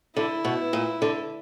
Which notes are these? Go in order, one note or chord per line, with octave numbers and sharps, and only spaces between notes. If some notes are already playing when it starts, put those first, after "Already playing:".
D3 E4
B2
A#2
D3